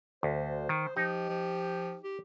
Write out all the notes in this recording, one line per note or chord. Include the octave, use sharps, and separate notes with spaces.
D2 C5
D#3
F3 D#4 G4
F3
G4